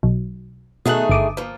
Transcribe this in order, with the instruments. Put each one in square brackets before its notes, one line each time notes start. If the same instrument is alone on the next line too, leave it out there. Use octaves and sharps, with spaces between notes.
[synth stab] B1
[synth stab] B2 F#6 [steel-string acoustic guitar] D#3 A3 G#4
[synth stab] G1 D6 D#6
[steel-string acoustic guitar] F3 A#3